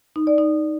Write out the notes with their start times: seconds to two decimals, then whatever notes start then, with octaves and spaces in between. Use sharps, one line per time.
0.16 D#4
0.27 D5
0.38 D#4